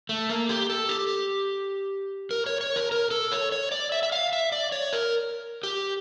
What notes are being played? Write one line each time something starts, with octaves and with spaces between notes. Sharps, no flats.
A3
A#3
G4
A4
G4
A#4
C#5
C#5
A#4
A#4
A4
C#5
C#5
D5
E5
E5
F5
E5
D5
C#5
A#4
G4